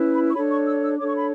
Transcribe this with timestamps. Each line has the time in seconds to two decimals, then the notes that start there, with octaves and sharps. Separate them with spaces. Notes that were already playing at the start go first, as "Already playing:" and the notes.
Already playing: C#4 E4 B4
0.13 B5
0.29 C#6
0.34 D4 A4 C#5 B5
0.50 C#6
0.66 E6
0.83 E6
0.99 D4 A4 C#5 D6
1.07 C#6
1.17 B5